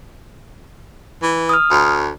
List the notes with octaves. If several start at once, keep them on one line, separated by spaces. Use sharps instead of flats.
E3
D#6 F6
D2